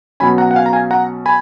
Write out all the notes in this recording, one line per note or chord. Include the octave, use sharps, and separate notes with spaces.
B2 F#3 C#4 G#5 B5
F#5 A#5
F#5
F5 G#5
A#5
F5 G#5
F#5 A#5
G#5 B5